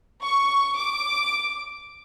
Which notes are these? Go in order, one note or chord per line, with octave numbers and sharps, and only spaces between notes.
C#6
D6